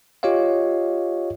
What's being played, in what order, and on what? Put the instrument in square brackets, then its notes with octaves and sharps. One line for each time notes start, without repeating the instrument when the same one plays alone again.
[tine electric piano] F4 G4 C#5 D#5 F5